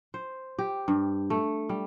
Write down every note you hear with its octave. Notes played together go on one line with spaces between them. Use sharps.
C5
G4
G2
A3
G3